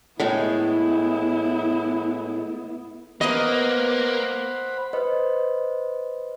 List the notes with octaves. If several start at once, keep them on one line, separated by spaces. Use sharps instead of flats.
A2 G#3 B3 E4
A#3 B3 C5 D#5 F#5 B5
B4 C5 D#5